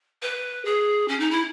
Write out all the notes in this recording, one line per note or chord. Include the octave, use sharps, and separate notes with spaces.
B4
G#4
C#4
D#4
E4